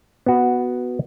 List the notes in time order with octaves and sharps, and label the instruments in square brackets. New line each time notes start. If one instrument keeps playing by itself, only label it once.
[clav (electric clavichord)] B3 F#4